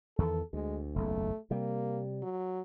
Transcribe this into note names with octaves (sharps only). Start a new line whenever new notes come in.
E2 D#3 E3 A4
D2 G#3
F#1 B1 E2 A3
C3 G3 A#3
F#3